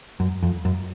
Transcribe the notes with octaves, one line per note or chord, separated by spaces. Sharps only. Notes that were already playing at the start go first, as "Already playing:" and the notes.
F#2
F2
F#2